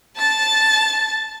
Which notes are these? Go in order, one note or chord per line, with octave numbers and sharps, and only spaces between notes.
A5 A6